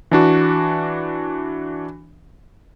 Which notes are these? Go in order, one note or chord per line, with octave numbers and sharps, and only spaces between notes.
E3 D4 F#4